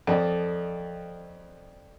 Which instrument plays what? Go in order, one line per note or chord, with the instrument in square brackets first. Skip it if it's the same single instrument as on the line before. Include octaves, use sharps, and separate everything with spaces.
[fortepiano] F2 [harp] A4 D5 D#5